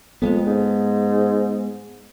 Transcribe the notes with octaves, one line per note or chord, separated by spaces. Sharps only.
F2 G#3 A3 B3
G#2